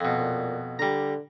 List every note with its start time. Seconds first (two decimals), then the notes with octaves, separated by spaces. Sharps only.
0.01 F2 B2
0.18 A#2
0.79 D3 G3 A#5